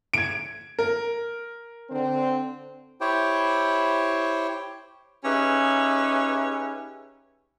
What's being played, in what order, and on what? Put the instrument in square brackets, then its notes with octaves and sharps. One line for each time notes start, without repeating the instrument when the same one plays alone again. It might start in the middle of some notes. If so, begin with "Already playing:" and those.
[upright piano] G#6 D7
A#4
[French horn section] D3 C4
[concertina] E4 G4 C5 C#5 G5
[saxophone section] C#4 D#4 G4 G#4 B4 E5